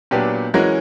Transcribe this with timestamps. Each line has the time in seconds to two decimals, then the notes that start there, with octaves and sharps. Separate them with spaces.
0.11 A#2 F#3 B3 D4 G4
0.54 E3 G#3 C#4 F#4 A#4